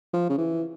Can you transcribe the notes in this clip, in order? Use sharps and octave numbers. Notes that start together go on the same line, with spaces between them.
F3
C#3
E3